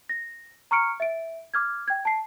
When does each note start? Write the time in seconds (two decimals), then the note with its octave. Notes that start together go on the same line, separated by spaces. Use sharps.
0.09 A#6
0.71 A#5 C#6 F6 C#7 D7
1.00 E5 D7
1.54 D6 F6 G#6
1.88 G5 G#6
2.05 A5 C7